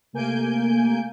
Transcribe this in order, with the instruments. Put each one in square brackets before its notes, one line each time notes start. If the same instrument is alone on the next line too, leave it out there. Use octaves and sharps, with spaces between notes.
[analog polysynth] C3 A3 A#3 G#5 G6 D7